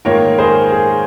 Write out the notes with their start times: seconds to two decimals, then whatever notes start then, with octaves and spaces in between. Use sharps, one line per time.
0.05 G#2 D#3 A#3 F4 A#4 C#5
0.39 G#4 C5
0.72 G#4